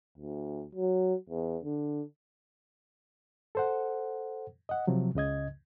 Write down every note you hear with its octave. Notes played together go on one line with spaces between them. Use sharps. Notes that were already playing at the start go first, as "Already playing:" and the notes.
D2
F#3
E2
D3
A4 C5 F#5
D#5 F#5
C3 F3 F#3
C#2 C#3 D#5 G#6